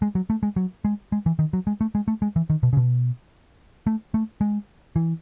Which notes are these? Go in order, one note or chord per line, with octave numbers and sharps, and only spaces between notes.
G#3
F#3
A3
G#3
F#3
G#3
G#3
E3
D#3
F#3
G#3
A3
G#3
A3
G#3
E3
D#3
B2
C#3
B2
A3
A3
G#3
E3